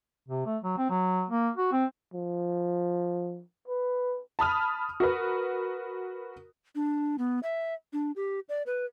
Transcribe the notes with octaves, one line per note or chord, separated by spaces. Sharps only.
C3
A3
F#3
C4
F#3
A#3
F#4
C4
F3
B4
A5 B5 D#6 F6
F#4 A#4 B4
D4
B3
E5
D4
G4
D5
B4